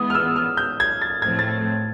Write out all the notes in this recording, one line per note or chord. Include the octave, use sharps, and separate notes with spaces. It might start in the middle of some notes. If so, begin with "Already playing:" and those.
Already playing: E3 G#3 B3 D#6
F6
E6
F6
G6
G#6
A6
A2 F3 A3 C4 G#6
A6